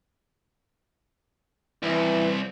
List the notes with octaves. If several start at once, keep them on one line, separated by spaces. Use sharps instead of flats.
C2 E3